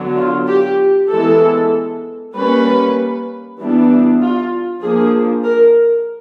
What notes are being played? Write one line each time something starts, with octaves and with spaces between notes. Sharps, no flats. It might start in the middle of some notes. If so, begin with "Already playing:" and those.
Already playing: D3 F#3 B3 D4
F4
G4
E3 G#3 B3 A4
G3 A#3 C#4 B4
E3 G3 B3 D4
F4
F3 A#3 D4 G#4
A#4